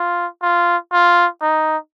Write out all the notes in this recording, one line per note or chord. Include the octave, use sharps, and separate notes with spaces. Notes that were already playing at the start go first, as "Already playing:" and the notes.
Already playing: F4
F4
F4
D#4